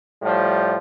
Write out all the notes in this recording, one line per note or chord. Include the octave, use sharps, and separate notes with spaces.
A2 F3 G3